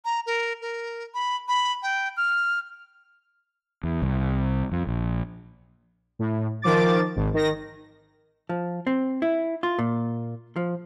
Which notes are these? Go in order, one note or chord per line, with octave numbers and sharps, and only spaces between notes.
A#5
A#4
A#4
B5
B5
G5
F6
E2
C2
F2
A#1
A2
D#3 F3 D6 A6
G#1
D#3 A#6
F3
C4
E4
F4
A#2
F3